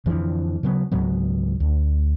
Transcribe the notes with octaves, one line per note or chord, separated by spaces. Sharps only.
F2 D3 E3 F3
C#3 F#3 B3
C#2 G#2 F#3 B3
D2